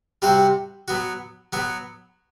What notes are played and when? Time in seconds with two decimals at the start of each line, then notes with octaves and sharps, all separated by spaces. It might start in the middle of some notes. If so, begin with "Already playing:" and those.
0.22 C3 G3 C4 F#4 C5
0.88 F#3 B3 F#4
1.53 F#3 B3 F#4